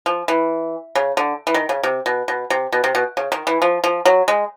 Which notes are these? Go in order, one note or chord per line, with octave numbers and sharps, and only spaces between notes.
F3
E3
C#3
D3
E3
D#3
C#3
C3
B2
B2
C3
B2
C3
B2
C#3
D#3
E3
F3
F3
F#3
G#3